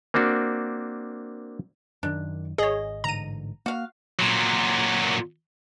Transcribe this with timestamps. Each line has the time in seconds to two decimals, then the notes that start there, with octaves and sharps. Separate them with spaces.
0.14 A#3 C4 D4 F#4
2.03 F#2 D#3 D4
2.58 G#1 G#4 C#5 D#5
3.04 A1 G#2 D3 A#5 D#7
3.66 A#3 F#4 F5
4.19 A#2 F#3